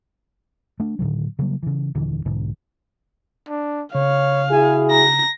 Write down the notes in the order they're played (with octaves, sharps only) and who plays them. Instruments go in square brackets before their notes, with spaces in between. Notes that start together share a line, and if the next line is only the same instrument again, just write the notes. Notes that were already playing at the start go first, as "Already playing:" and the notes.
[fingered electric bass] A3 D4
A2 D3 D#3 F#3
C#3 F#3 G3 A#3
C#3 E3
D#1 D3 E3
B1 G#2 D3
[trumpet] D4
[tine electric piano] C#3 [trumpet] C#5 [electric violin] F5
[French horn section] E4 F#4 G#4 [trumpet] G#5
[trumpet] A#5 [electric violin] A#6